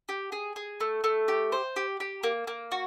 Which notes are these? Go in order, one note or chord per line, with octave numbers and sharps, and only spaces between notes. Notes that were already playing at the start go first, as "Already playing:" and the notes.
G4
G#4
G#4
A3
A3
G4
C5
G4
G4
A#3
A#3
F#4